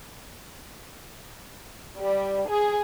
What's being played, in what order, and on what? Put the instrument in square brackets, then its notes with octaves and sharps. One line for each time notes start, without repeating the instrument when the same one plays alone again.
[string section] G3
G#4